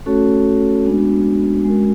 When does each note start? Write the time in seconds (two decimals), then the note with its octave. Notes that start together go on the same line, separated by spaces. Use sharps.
0.06 A3 C#4 F#4 A4 C#5
0.86 G#3 B3 D4 F#4
1.64 G#3 C#4 F#4 A#4